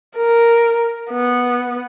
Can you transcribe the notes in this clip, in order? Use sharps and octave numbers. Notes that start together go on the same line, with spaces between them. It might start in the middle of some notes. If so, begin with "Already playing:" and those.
A#4
B3